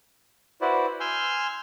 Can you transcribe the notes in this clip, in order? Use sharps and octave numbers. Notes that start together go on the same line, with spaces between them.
E4 F#4 B4 C5 D5
G#5 C6 E6 F6 G6